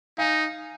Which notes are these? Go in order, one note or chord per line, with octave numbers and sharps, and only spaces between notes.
D#4 F5 G#5